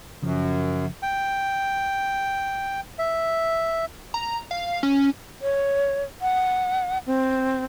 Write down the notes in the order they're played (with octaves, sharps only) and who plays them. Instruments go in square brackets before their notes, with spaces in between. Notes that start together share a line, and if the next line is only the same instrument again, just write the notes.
[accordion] F#2 [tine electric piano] C#3 F3
[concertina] G5
E5
[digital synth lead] A#5
F5
C#4
[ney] C#5
F#5
C4